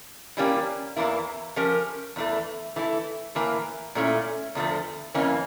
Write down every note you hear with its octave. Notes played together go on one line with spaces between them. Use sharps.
E3 G3 A#3 C#4 G4
E2 E3 A#3 E4
F3 C#4 G4 A#4
E2 E3 A3
E3 A3 E4
A2 E3 A#3
A#2 A3 C#4 E4
E2 D3 F3 A3
F2 E3 A#3 C#4